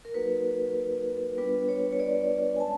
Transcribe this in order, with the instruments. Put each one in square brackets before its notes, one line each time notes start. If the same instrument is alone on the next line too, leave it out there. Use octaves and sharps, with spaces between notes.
[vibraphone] A#4
F#3 A#3 D#4 F#4 B4
G3 B3 D4 F4 B4
C#5
C#5
D5
G#5
G#3 C#4 A5